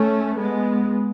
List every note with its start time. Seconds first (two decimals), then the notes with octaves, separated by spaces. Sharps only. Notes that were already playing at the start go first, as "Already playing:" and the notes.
Already playing: A3 C#4
0.37 G#3 B3